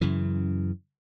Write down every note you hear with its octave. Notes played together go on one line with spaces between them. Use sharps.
F#2 C#3 E3